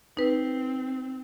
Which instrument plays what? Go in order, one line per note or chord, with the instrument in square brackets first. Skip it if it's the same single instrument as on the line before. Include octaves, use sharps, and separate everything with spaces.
[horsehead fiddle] C4 [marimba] D#4 B4